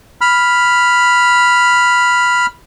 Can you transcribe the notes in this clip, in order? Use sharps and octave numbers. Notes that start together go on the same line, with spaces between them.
B5 F6